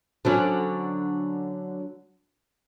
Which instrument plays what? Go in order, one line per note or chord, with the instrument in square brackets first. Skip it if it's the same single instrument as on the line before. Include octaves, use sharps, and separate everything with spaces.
[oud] D3 F#3 C#4